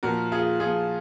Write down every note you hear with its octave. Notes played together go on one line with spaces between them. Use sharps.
A#2 F3 F#4 A#4
F4 G#4
A#2 F3 F4 G#4